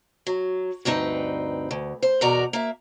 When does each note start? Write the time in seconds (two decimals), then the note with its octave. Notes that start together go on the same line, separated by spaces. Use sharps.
0.27 F#3
0.85 D2 G2 C4 D#4 B4
1.71 D2
2.02 C5
2.21 E2 B2 F#4 A#4 D5 A#5
2.53 A#3 E5